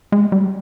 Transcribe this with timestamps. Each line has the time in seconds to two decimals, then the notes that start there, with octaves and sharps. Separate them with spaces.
0.12 G#3
0.32 G3